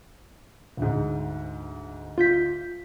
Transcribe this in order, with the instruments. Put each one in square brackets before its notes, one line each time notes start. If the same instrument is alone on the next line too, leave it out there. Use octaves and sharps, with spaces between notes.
[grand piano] D2 G#2
[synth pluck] F4 G6 B6